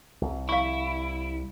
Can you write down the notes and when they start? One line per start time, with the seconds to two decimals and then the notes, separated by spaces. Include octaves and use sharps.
0.21 C2
0.49 E4 F5 C#6